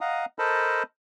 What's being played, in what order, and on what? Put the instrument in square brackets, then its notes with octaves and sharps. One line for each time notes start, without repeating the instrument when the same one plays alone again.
[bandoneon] D#5 F5 F#5 A#5 D#6
A4 A#4 C5 D#5 A5 B5